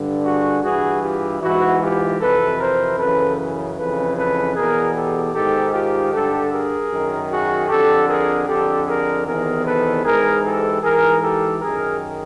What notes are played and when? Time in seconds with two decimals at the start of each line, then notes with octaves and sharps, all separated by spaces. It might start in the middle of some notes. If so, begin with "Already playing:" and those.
Already playing: G2 D3
0.25 F#4 G#4
0.63 G2 E3 F#4 G#4
1.02 F4 G4
1.42 G#2 E3 E4 F#4
1.81 F4 G4
2.20 F2 C3 E3 A4 B4
2.60 A#4 C5
2.99 F#2 C#3 E3 A4 B4
3.77 F2 C#3 E3 A4 B4
4.16 A4 B4
4.55 E2 B2 G#4 A#4
4.94 G4 A4
5.33 G#2 D#3 G4 A4
5.73 F4 G4
6.12 G2 D3 G4 A4
6.51 G#4 A#4
6.91 F#2 D#3
7.31 F#4 G#4
7.69 F2 D3 G4 A4
8.09 G#4 A#4
8.48 F2 D3 G4 A4
8.86 G#4 A#4
9.26 E2 C3 D#3 G#4 A#4
9.65 A4 B4
10.04 G#2 E3 G#4 A#4
10.43 G4 A4
10.82 G#2 E3 G#4 A#4
11.22 G4 A4
11.61 F#2 D#3 G#4 A#4